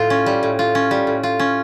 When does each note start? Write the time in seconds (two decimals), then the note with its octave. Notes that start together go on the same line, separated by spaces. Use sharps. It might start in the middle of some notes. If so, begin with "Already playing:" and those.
Already playing: A2 F4
0.10 C#4
0.26 G3
0.43 A2
0.59 F4
0.75 C#4
0.91 G3
1.07 A2
1.23 F4
1.39 C#4